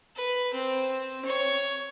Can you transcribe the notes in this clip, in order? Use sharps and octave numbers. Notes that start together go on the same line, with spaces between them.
B4
C4
C#5